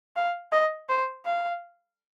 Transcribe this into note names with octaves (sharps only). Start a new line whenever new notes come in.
F5
D#5
C5
F5